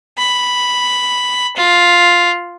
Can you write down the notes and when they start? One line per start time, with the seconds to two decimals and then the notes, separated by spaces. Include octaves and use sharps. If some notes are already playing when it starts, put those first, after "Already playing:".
0.18 B5
1.57 F4